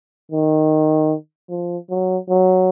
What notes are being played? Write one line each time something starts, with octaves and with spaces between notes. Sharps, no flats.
D#3
F3
F#3
F#3